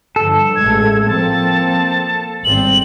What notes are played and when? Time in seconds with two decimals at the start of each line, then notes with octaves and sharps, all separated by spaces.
0.16 G2 D3 F3 A4
0.56 A1 G#3 A3 G#6
1.07 F3 A#3 C4 A5
2.45 G#1 G3 C4 F#7